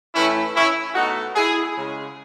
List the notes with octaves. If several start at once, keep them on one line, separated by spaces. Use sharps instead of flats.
A2 E3 A3 C#4 E4
C#4 E4
B2 A3 D#4 F#4
E4 G#4
C#3 G#3